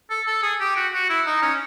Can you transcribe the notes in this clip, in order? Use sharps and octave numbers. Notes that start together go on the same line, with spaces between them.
A4
A4
G#4
G4
F#4
F#4
E4
D#4
C#4